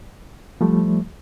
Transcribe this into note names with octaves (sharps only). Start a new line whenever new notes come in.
F3 G3 A3